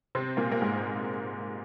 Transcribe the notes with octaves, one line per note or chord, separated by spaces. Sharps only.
C3 C4
A#2 A#3
A#3
G#2 G#3